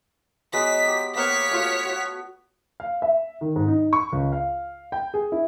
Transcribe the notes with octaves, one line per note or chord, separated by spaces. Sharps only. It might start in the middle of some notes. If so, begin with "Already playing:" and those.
F#3 G#3 B3 B6
G4
A#3 B3 C#5 F5 B6
A3 F4 F#4
F#4
F5
E5
D#3
G#2
D#4
C#6
C#2
F5
G5
G#4
E4